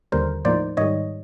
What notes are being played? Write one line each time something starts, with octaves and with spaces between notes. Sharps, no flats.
D#2 D3 G3 A#4 C5
A2 F3 A#3 D#4 C5 D5
G#2 D#3 G3 C#5 D#5